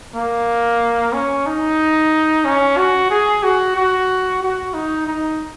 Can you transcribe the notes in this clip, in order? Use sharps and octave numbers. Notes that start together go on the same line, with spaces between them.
A#3
C#4
D#4
C#4
F#4
G#4
F#4
F#4
F#4
D#4
D#4